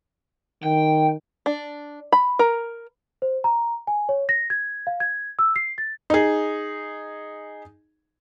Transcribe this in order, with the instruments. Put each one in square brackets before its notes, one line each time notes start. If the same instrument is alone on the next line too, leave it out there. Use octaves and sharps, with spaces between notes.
[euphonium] D#3 [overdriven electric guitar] G5
[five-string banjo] D4
B5
A#4
[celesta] C5
A#5
G#5
C#5
A#6
G#6
F5
G#6
E6
C7
A6
[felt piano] D#4 G#4